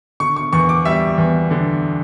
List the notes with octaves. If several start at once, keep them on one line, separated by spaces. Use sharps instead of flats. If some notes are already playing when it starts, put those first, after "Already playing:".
D3 C#6
C#6
E2 C#6
D6
G3 E5
E2
D3